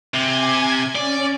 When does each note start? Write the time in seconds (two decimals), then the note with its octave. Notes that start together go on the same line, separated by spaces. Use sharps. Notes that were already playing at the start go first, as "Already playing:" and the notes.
0.14 C3 G#5 G#6
0.96 C#4 D5